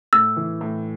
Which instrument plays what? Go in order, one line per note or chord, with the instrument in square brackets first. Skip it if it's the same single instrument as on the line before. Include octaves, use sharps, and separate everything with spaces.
[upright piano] A2 [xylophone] E6
[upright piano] E3
A2